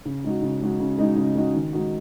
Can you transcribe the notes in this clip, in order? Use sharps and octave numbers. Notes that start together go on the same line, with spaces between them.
C#3
G#3 D#4 F#4
C#3
G#3 D#4 F#4
C#3
G#3 D#4 F#4
C#3
G#3 D#4 F#4
D#3
G#3 D#4 F#4